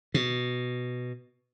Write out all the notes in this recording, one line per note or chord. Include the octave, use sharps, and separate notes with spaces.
B2